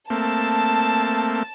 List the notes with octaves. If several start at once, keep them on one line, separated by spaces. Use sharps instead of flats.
A3 A#3 C4 A5